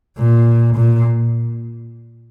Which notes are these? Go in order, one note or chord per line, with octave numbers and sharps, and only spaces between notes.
A#2
A#2